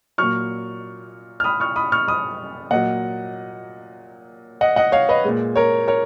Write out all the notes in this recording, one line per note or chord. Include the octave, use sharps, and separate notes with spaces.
A#2 F#3 C#6 F6
F6
B5 D#6
C#6 F6
B5 D#6
C#6 F6
B5 D#6
A#2 F#3 D#5 F#5
D#5 F#5
D#5 F#5
C#5 F5
B4 D#5
A#2 G#3
A#4 C#5
A#4 C#5